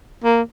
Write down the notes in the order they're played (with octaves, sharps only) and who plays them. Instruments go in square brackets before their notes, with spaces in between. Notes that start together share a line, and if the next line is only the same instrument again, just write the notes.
[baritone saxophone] A#3